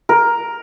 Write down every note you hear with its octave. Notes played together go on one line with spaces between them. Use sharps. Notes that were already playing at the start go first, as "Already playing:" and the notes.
A#4